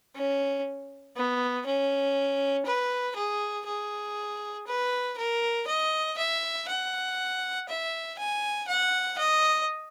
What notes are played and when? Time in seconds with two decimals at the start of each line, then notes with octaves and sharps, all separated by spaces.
0.15 C#4
1.16 B3
1.66 C#4
2.65 B4
3.16 G#4
3.66 G#4
4.67 B4
5.18 A#4
5.67 D#5
6.18 E5
6.68 F#5
7.69 E5
8.19 G#5
8.68 F#5
9.18 D#5